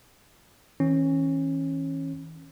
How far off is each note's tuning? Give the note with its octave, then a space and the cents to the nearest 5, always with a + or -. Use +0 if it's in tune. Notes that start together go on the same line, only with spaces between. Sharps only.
E3 -40 C#4 -25